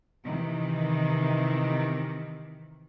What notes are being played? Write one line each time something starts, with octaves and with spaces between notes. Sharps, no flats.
C3 D#3 E3